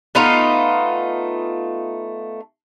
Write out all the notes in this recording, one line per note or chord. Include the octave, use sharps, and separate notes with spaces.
A3 B3 D#4 F4